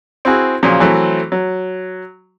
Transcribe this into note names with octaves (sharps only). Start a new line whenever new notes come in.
C4 E4 F#4 G#4
A#2 C#3 F3 F#3
E3 F#3 A3 C4
F#3